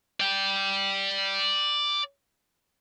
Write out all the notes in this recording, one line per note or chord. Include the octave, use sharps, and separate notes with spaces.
D5 G5